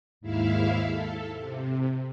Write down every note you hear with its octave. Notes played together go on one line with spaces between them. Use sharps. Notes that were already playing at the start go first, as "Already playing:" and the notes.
D#2 G#2 E4 E5 F5
A4
C3